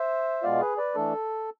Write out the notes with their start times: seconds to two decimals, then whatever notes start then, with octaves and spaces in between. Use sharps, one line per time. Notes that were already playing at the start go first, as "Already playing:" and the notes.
Already playing: C5 E5
0.43 B2 G#3 B3 F4 D5 F5
0.60 G#4 B4
0.78 B4 D5
0.95 E3 A3 D4 A4